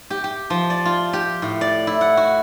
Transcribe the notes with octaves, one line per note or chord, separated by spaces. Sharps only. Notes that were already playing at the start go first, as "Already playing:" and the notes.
G4
G4
F3
D5
F4
G4
A2
D5
E4
F#5
F#4